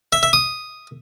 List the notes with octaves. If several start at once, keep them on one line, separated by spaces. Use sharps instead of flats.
E5
E5
D#6